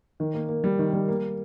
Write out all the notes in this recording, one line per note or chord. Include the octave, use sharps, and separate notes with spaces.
D#3
A#3
A#3
G3
D#3
G3
A#3